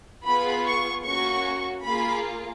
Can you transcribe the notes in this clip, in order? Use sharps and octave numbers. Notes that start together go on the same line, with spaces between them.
B3 F4 G#4 B5
C#6
A#3 C#4 F#4 C#6
A#3 F4 G#4 B5